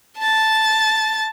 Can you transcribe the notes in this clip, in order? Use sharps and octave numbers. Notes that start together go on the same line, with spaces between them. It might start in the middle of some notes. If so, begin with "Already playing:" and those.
A5 A6